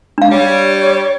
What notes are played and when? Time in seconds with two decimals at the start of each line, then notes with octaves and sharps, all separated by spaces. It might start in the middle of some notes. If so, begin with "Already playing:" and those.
0.18 D4 F5
0.31 G3 C#5